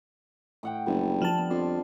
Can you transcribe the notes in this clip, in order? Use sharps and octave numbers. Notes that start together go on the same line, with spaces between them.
A2 F#5 G5
F#1 D3 G3
F3 A5
B3
F2 D5 C6